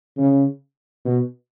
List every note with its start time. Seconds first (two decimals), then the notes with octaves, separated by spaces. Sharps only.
0.17 C#3
1.05 B2